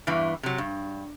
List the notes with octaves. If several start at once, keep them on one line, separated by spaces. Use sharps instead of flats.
E2 G2 E3
C3 F#3
G2